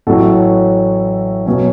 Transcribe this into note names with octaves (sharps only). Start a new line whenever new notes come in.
A1 A2 F#3 C#4 F#4 A4
B2 F#3 C#4